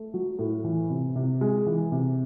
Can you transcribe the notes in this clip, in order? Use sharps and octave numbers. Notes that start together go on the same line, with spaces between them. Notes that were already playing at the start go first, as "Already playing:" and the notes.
Already playing: A3
F#3
A2
E3
C3
C3
G#3
E3
C3